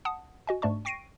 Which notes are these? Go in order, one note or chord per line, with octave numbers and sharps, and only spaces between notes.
F#5 A5 D#6
F#4 D#5 G#5
G#2 A3 D4 D5 A5 C#6
G5 C#6 A#6 C7 D7 D#7